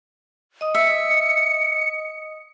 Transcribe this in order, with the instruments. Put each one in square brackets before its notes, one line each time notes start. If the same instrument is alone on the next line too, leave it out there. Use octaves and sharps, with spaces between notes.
[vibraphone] D#5 D#6
[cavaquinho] E5 [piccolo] C#7